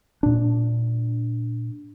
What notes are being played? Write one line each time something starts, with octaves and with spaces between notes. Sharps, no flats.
A#2 D4